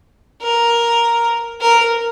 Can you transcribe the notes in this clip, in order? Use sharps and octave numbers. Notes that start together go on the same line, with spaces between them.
A#4
A#4